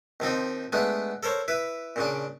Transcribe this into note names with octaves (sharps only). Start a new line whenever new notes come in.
D#2 F3 C4 D#4
G#3 A3 B3 D4
A4 A#4 C5 C#5
E4 B4
A#2 C#3 D4